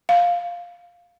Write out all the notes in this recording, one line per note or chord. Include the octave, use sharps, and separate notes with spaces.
F5